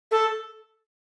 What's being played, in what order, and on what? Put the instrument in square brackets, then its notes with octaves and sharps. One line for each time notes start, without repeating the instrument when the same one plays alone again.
[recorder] A4